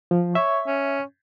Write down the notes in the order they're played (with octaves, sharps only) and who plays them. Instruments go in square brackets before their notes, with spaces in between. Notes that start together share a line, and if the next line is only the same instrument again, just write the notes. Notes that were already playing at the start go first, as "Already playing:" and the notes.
[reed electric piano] F3
[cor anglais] C#5 [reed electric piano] E5
[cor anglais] C#4